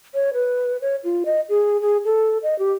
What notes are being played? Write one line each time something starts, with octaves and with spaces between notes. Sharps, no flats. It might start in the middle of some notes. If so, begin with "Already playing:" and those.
C#5
B4
C#5
F4
D#5
G#4
G#4
A4
D#5
G4